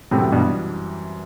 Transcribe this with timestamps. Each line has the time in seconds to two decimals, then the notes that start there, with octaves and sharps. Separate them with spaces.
0.11 F#2 A2 C3 E3 G3 C4 F#4
0.32 G2 B2